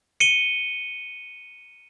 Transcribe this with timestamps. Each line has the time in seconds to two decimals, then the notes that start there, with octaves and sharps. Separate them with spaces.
0.20 C#7 D#7 G7